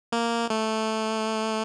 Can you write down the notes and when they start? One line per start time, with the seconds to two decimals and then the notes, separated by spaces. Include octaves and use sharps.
0.12 A#3
0.50 A3